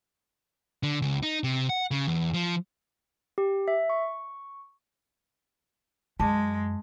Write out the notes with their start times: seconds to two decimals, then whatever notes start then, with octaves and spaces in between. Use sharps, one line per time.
0.83 D3
1.02 C#2
1.23 D#4
1.44 C3
1.69 F#5
1.91 C#3
2.08 E2
2.34 F3
3.38 G4
3.68 E5
3.90 C#6
6.20 F#2 G#3 A5 D6